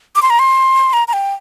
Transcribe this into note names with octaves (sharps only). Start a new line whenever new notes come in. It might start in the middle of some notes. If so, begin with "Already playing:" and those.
D6
C6
A#5
C6
A#5
A#5
G5